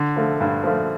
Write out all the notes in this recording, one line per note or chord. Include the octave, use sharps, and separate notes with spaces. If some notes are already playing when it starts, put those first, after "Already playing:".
Already playing: D3
F3 A3
G2
F3 A3